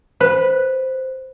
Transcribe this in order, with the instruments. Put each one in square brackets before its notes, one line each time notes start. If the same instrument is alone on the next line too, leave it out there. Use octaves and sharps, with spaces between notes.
[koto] B4 [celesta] C5